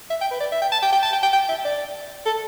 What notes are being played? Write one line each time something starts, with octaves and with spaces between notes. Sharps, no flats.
E5
G5
B4
D5
E5
G5
A5
G5
G5
A5
G5
G5
G5
E5
D5
A4